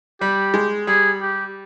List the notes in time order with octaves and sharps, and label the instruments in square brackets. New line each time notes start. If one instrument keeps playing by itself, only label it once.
[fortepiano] G3 [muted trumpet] G4
[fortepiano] G#3
[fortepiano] G3 [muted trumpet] G#4
[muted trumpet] G4